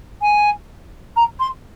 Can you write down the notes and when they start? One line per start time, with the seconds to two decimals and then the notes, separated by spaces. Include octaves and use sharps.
0.22 G#5
1.16 A#5
1.40 C6